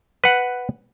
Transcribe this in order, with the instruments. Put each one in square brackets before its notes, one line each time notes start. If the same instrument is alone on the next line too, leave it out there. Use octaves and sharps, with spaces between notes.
[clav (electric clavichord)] B4 F#5